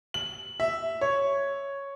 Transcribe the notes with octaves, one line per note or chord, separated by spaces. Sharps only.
F#7
E5
C#5